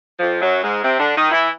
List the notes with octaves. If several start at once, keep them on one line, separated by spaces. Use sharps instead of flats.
F2 F3
F#2 F#3
G#2 G#3
C3 C4
D3 D4
D#3 D#4
E3 E4